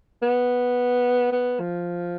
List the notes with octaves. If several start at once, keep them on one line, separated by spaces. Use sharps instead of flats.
B3
B3
F3